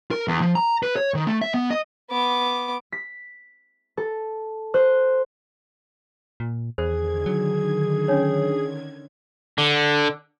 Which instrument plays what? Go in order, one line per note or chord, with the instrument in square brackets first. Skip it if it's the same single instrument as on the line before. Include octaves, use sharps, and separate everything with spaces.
[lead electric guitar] A#4
E2
F3
A#5
B4
C#5
D#3
A3
E5
B3
D#5
[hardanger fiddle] B3 D6
[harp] B6
A4
C5 F#6
[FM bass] A#2
[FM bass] E2 [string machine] D3 D#3 G#6 [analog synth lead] G#4 [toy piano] C5
[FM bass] F#3
[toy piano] C#4 D4 C#5
[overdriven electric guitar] D3